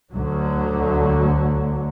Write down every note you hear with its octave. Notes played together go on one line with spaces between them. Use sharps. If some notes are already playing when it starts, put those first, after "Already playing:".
D2 D3 F#3